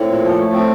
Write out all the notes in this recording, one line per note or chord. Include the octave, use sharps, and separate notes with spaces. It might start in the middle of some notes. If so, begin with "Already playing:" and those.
Already playing: A2 C4
A#2
F3
A3
C4